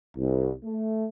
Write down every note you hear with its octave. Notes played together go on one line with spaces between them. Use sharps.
C2
A3